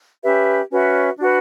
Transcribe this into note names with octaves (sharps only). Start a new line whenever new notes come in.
C#4 G4 B4 E5
C#4 F#4 B4 E5
D4 F#4 B4